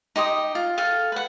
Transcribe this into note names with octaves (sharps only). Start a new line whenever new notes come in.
D#4 G4 C6 D#6
F4
A4 F5 G5
B4 F#5